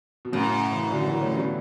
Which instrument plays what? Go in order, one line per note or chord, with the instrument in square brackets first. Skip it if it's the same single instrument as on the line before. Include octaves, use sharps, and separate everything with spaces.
[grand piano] B2
[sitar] F#2 [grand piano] A2 C#3
[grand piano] C#3 E3
D3 F#3
E3 G3
A3 C#4
G3 B3